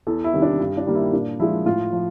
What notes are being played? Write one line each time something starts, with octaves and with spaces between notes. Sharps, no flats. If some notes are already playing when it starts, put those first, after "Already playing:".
E2 A4
E4
C3 D#3 G3
D4
G2
D4
D#3 G3 A#3
E4
A#2 D4
F3 G#3 E4
A2 F4
F3